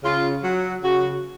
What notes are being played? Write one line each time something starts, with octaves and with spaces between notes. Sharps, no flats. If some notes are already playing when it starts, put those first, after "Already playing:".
C#3 F4
F#3
C#3 F#4